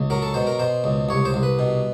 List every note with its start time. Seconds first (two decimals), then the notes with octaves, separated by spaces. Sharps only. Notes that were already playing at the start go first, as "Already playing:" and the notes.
Already playing: C#2
0.10 F#3 A#4
0.22 A4
0.34 B2 C5
0.47 A#4
0.59 B2 C5
0.84 C#2
1.09 C2 C#5
1.25 C5
1.34 C2
1.43 B4
1.59 B2